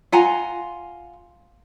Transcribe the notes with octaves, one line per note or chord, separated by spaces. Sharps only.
F4 F#5 G#5 A#5